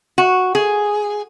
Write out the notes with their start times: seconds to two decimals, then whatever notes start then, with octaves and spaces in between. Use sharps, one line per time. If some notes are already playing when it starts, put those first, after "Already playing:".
0.18 F#4
0.55 G#4